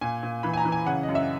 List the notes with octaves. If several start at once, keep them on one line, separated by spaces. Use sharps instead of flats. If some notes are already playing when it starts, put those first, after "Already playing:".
A#2 G#5
A#2
E3 B5
G#5
A#5
E3
G#5
C#3 F#5
D#5
F#2
E5